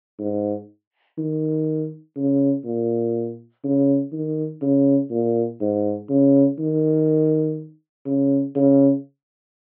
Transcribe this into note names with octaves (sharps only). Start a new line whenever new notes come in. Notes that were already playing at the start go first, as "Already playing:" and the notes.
G#2
D#3
C#3
A#2
C#3
D#3
C#3
A#2
G#2
C#3
D#3
C#3
C#3